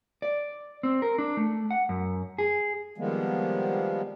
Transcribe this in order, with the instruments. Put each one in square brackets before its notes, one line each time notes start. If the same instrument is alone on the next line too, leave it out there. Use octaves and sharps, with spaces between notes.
[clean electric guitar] D5
C4
A#4
D4
A3
F#5
F#2
G#4
[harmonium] D#3 F3 G3 G#3 A#3 B3